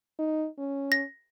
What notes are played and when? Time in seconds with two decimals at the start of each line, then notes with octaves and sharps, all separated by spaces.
0.19 D#4
0.59 C#4
0.92 A#6